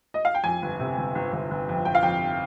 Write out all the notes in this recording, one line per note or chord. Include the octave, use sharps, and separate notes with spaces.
D#5
F5
G5
F2 G#5
G1
C3
G1
G1
G1
G1
F2
G1 G5
F5
F2 G5